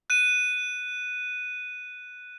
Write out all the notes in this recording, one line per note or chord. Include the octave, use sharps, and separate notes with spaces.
F#6 D#7